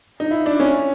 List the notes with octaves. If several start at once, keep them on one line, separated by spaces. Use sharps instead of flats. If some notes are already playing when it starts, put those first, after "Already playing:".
D#4
E4
D4
C#4